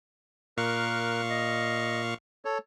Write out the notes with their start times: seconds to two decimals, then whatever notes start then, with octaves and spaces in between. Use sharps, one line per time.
0.58 A#2 A#4 F5 C#6 F#6
1.30 D#5
2.45 A4 C#5